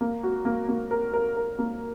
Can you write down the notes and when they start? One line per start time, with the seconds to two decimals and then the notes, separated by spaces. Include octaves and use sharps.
0.01 A#3
0.23 F#4
0.45 A#3
0.69 A#3
0.91 A#4
1.14 A#4
1.36 A#4
1.59 A#3